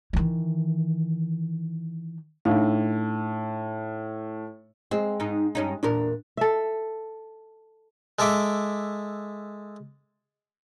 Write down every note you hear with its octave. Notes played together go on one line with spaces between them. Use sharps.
D#3 E3
A2 D4 D#4 F5
G#3 C4
G#2 D#4
G2 C#4 D#4
E2 A#2 D4 A#4
A4 E5
G#3 A4 E5 D6